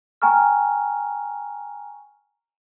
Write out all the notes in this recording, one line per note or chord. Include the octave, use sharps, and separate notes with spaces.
G5 G#5 A#5 C#6 F6